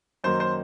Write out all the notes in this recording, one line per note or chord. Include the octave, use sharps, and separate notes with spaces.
F#2 D#3 F#3 A#3 D#4 C5
C5